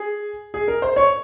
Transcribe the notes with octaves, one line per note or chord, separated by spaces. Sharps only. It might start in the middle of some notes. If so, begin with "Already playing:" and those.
Already playing: G#4
G#4
A#4
C5
C#5